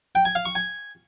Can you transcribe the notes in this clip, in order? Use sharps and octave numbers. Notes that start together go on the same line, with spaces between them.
G5
G#5
F5
C#6
G#5